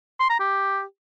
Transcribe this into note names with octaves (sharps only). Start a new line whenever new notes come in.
C6
A#5
G4